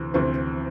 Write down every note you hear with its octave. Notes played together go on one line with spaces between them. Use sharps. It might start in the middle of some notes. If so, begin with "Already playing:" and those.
Already playing: D2 C3 E3 C4
D2 C3 E3 C4